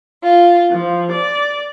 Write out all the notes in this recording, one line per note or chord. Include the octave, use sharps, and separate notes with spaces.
F4
F3
D5